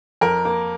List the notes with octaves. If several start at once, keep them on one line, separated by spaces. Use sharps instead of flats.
F2 A#4
A#3